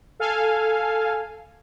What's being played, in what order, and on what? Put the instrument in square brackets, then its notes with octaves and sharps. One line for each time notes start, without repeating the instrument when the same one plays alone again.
[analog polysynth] A4 F5 G#5